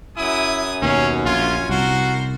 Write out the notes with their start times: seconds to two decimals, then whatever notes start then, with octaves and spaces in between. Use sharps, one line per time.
0.17 F#2 E4 G#5 D#6
0.82 D#2 B2 C#4 E4 A#4 F5
1.26 A#1 C#4 F4 G#5
1.69 C2 F#4 A4 A#4 C5